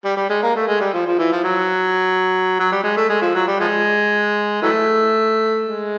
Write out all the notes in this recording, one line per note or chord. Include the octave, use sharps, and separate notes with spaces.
G3
G3
G#3
A#3
A3
G#3
G3
F3
F3
E3
F3
F#3
F#3
G3
G#3
A3
G#3
F3
F#3
G3
F3 G#3
E3 F#3 A3
G#3